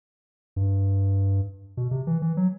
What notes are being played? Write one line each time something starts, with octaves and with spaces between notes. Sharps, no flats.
G2
B2
C3
E3
E3
F#3